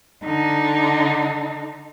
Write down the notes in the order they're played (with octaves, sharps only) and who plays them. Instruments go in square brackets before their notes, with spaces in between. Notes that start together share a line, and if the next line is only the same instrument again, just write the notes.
[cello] D3 D#4